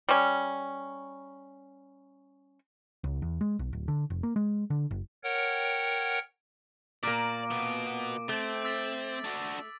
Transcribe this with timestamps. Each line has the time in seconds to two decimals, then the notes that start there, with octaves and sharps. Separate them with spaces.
0.09 G3 C#4
3.04 C#2
3.22 E2
3.41 G#3
3.59 B1
3.73 D1
3.88 D3
4.10 F1
4.23 A#3
4.36 G#3
4.70 D3
4.91 F#1
5.24 A#4 C#5 F#5 G5
7.03 A#2 A#3 D5 D6 D7
7.51 B2 B3
8.29 A3 C4
8.65 E6 A6 B6
9.24 D4 F#4